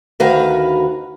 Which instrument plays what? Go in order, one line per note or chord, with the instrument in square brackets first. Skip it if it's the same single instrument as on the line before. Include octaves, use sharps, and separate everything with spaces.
[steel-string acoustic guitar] D2 D#3 F#4 B4 F5